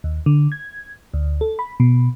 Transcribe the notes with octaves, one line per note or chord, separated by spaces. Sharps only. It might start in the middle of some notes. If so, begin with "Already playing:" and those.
D#2
D3
G#6
D2
A4
B5
B2